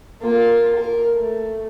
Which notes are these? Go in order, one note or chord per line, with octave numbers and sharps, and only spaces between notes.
A#3 F4
A#4
A3